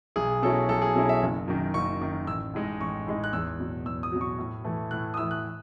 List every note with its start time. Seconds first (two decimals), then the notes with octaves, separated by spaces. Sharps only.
0.16 B1 G#4
0.42 B2 F#3 C#4 E4 A4
0.69 B1 A4
0.82 G#4
0.95 B2 F#3 C#4 E4 A4
1.09 E5
1.22 F#1
1.48 F#2 D#3
1.74 F#1 C#6
2.01 F#2 D#3
2.27 A1 E6
2.54 A2 G#3 D#4
2.80 A1 C#6
3.07 A2 G#3 D#4
3.24 F#6
3.33 E2 E6
3.60 B2 F#3
3.85 E2 E6
4.03 D#6
4.12 B2 F#3
4.21 C#6
4.38 A2
4.64 E3 A3 E4
4.91 A2 F#6
5.14 D#6
5.17 E3 A3 E4 E6
5.31 F#6